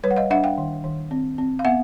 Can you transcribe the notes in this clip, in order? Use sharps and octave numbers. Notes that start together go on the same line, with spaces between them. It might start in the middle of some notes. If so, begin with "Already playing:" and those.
G3 B4 C#5
F#5
D#5 F5
D4 E5 F#5
F5 G5
D#3
D#3
C4
C4
F5
B3 E5 F#5